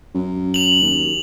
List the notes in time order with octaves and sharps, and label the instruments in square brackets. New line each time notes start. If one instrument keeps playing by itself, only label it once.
[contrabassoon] F#2
[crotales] F7 F#7
[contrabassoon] D#2